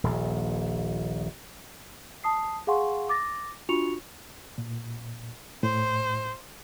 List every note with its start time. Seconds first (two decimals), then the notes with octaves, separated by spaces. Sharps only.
0.04 D#1 A#1
2.24 A5 D#6 C7
2.67 G#4 F5 F#5 G#5 C6 C#6
3.09 D6 A6 A#6
3.69 D4 F4 F#4 C#6 C#7 F7
4.58 A#2
5.63 A2 C5